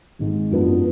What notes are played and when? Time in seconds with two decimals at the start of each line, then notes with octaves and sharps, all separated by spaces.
0.19 G#1 G#2 G#3
0.51 F#2 F3 B3 D4